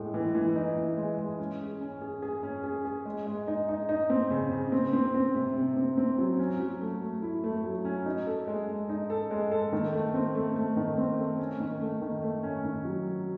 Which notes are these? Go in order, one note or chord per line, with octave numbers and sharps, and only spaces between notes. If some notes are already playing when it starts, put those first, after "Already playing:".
Already playing: A2 G#3
E3
E3
D#4
E3
G#3
G#3
C#4
G#4
C#4
G#4
G#4
C#4
G#4
G#4
G#3
G#3
D#4
D#4
D#4
C4
C#3
C#3
C4
C4
C4
C3
C3
C4
C4
F#3
C#4
F#3
A3
A3
E4
A3
F#3
C#4
D#4
A4
G#3
G#3
D#4
A4
G#3
A4
D#3
A3
C4
A3
A3
D#3
C4
A3
C#4
D#3
A3
D#3
A3
C#4
D#3
F#3